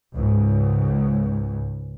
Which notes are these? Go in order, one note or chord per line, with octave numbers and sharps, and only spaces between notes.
C#2 G#2